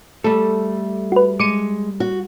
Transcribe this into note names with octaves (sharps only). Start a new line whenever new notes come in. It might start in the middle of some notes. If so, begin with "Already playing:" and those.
G3 A3 A4
F#4 B4
G#3 D6 C#7 D#7
F#4